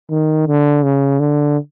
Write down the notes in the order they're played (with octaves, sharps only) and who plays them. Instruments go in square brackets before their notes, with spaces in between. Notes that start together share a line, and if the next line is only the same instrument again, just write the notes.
[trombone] D#3
D3
C#3
D3